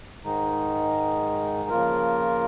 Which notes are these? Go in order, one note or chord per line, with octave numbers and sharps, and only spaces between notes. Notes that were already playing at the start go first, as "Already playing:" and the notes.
G#2 D#3 G#3 D#4
C#3 F3 A#3 F4 A#4